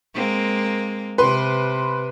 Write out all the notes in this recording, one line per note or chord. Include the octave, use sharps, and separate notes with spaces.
G#3 A#3 C4
C3 B4 C6